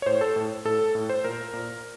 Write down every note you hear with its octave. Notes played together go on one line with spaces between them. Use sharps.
C#5
A2 C5
A4
A2
A2 A4
A2
C5
A#2 A#4
A#2